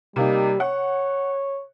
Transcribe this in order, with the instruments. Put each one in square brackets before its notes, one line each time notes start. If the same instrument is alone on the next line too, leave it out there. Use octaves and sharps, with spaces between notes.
[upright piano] C3 A#3 D#4 [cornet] G3
[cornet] C#5 [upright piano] F#5